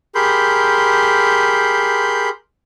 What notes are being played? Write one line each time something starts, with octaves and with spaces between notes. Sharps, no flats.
G4 G#4 A#4 B5 C6 G6